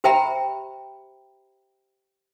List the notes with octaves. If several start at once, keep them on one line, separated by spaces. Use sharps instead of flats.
G4 C5 E5 G5 A#5 B5